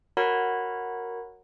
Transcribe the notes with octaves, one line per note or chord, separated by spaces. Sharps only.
F#4 A#4 C#5 F#5 A#5 B5